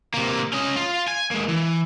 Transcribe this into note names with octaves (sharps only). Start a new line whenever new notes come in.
C3 A#3
C#4 D#5
F4
G#5
G#3 A#3
E3